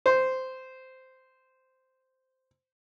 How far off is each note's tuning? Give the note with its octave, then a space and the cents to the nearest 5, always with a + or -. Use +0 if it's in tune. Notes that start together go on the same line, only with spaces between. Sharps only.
C5 -10